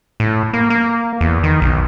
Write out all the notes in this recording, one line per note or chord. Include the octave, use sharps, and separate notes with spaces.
A2
A#3
A#3
E2
D#3
B1